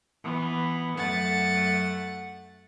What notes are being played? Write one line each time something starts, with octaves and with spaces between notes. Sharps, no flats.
E3 B3
F#2 A3 F#5 A6